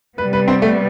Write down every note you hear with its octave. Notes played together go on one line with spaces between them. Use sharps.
C3 G3 B3 B4
B4
C4
A3